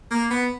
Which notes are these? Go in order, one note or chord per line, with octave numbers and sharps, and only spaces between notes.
A#3
B3